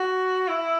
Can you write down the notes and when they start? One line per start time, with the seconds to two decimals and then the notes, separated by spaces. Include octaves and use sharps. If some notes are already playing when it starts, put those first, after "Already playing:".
Already playing: F#4
0.48 E4